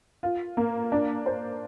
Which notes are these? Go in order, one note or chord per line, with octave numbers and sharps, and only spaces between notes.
F4
A#3
D4
C5